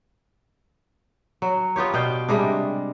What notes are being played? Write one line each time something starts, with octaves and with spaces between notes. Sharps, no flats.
F#3
B3 F4 G4 C#5
B2 D5 F5 G5
C3 G3 G#3 D4